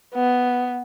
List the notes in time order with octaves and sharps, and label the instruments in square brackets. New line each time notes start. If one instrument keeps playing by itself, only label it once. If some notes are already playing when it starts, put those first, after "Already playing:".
[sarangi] B3